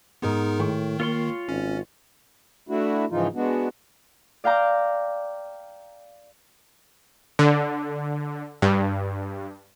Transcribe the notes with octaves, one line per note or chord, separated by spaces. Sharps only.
G#2 B3 D#4 G#4 A#4 C6
A2 D#3 G5 C#6
A#3 F4 C#5 C6
G#1 C#4
A3 D4 E4 F#4
G#2 C#3 E3 F3 D#4 F4
G#3 B3 D4 F#4
D5 F5 G5 A#5 D6
D3
G2